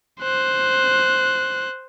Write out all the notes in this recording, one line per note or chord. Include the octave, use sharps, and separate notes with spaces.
C5 F#6